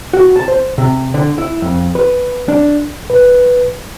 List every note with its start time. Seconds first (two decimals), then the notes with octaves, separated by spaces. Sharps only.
0.13 F#4
0.36 A5
0.48 C5
0.78 C3
1.14 D3
1.38 E4
1.62 F2
1.95 B4
2.48 D4
3.10 B4